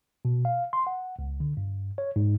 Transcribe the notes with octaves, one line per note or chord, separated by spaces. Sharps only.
B2
F5
C6
F#5
C#2
D3
G2
C#5
G#2